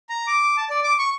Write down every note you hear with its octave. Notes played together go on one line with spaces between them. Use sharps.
A#5
D6
A5
D5
D6
C#6